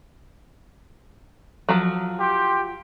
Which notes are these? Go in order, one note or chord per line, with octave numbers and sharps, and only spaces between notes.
F3 F#3
G4 G5 C6